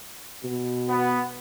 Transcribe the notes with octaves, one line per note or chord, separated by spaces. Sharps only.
B2
B3